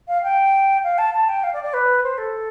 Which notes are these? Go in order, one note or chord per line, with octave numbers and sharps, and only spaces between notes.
F5
G5
F5
A5
A5
G5
F5
D5
D5
B4
C5
A4